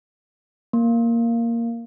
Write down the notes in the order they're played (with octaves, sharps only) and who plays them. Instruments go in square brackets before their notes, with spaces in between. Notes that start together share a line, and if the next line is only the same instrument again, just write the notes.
[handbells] A#3